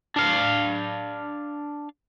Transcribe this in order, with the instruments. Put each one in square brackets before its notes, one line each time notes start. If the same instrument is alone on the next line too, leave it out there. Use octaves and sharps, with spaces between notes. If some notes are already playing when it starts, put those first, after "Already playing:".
[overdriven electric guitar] D4 F5